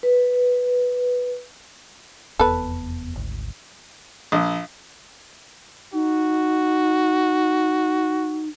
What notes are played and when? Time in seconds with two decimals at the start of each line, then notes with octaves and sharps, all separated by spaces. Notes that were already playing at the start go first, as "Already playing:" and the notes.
0.03 B4
2.39 F1 E2 B3 A4 B4
3.15 G#1 D2
4.32 A#1
5.94 D#4 F#4